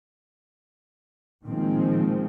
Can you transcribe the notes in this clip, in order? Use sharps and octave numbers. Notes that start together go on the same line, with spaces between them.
A#2 D#3 F3 G#3 C4